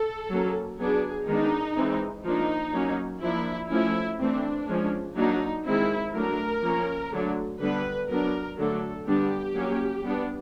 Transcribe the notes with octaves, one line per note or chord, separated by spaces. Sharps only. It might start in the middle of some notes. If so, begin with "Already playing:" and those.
Already playing: A4
F#3 A#3 C#4
F#3 B3 D4 G#4
D#3 G#3 B3 D4 D#4
E3 G#3 C4
F3 A#3 D4 D#4
F#3 A#3 C#4
F3 A#3 D4 E4
F3 A3 C#4 E4
E3 A3 C4 D4
F3 G#3 C#4
F#3 A#3 D4 D#4
D#3 G#3 C4 E4
F#3 A3 D4 A#4
F3 A#3 C#4
D3 F#3 A3 D4
D3 G3 B3 D4 B4
F#3 B3 D4 A#4
D3 F#3 A3 D4 A4
D3 G3 B3 D4 G4
F#3 A#3 C#4
G3 B3 D4